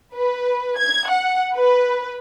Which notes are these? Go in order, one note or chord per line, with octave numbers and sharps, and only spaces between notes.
B4
G#6
F#5
B4